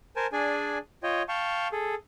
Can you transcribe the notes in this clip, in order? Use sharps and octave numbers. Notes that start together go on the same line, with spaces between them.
A#4 C5 G#5 A5
D4 G#4 D5 G#5
F4 C#5 D#5 G5
F5 G5 A5 C#6
G#4 A4